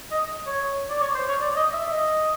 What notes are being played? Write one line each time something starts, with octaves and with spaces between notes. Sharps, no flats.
D#5
C#5
D5
C#5
C5
C#5
D5
D#5
E5
D#5